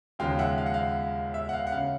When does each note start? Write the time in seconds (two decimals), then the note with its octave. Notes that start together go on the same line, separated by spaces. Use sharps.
0.19 D#2 C#3 F3 G#3 F5 G5
0.39 E5 F#5
0.58 F5
0.66 F#5
0.74 F5
1.34 E5
1.49 F#5
1.53 F5
1.67 F#5
1.72 C#3 F5